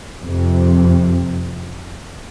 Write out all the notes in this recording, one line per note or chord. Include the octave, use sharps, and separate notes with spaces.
F2
C3